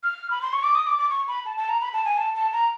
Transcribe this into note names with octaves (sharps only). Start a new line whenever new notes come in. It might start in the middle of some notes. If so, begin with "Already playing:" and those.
F6
B5
C6
C#6
D6
D#6
D6
D6
C#6
B5
A5
A5
A#5
B5
A5
G#5
A5
A5
A#5